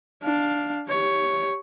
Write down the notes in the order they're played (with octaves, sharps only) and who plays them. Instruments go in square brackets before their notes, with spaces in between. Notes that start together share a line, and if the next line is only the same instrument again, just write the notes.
[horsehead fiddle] D4 F5
G4 C#5